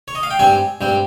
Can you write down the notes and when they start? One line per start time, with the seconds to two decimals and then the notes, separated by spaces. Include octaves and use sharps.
0.08 C#5
0.15 D#5
0.23 F5
0.31 G5
0.39 G2 G3 C4 G#5
0.81 G2 G3 C4